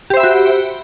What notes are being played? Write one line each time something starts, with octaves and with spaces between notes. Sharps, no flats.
F#4 G4 C5 E5 B5